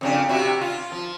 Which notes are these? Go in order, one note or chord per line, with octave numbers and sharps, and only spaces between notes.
F2 C#3 D4
C3 E4 F#4
F4
F3